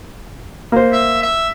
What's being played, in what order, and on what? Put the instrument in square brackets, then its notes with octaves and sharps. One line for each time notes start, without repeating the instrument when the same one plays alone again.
[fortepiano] A#3 C5
[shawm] E5
E5